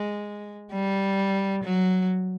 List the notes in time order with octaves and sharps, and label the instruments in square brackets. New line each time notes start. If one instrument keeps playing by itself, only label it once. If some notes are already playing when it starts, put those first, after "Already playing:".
Already playing: [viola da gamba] G#3
G3
F#3